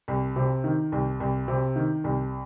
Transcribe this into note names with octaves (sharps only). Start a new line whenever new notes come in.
C2
C3
D#3
C2
C2
C3
D#3
C2